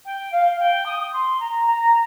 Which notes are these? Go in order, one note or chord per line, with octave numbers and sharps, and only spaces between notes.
G5
F5
G5
D#6
D#6
C6
A#5
A#5